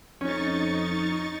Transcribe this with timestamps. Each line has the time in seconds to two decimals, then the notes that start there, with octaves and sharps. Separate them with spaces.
0.21 F2 C#4 D#4 C#6 A6